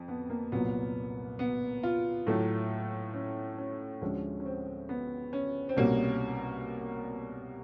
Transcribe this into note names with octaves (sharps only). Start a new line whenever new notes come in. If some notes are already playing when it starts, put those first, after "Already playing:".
Already playing: F2
B3
A#3
C2 A#2 F#3 A#3 B3
B3
F4
A2 F#3 A3
C#4
C#4
D2 D3 F3 G#3 C#4
C#4
C4
B3
C#4
C4
C2 B2 G3 A#3 C#4